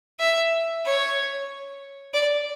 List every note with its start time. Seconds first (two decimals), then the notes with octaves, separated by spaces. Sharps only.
0.19 E5
0.85 C#5
2.13 D5